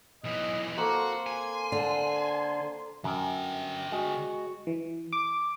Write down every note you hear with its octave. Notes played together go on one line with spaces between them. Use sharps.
B1 E3 D#5
A#3 C4 F#4 A4 C6
G#5
D3
F#2 D3 G5
G#3 F#4
E3
D6